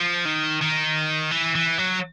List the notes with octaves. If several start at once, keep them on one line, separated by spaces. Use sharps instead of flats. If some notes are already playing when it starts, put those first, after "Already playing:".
Already playing: F3
D#3
D#3
E3
E3
F#3